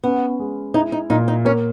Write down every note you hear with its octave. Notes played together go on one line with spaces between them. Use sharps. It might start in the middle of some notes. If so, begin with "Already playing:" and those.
B3 C#4
G#3
D#4 E4
D#4
A#2 D#4
D#4
A#3 C#4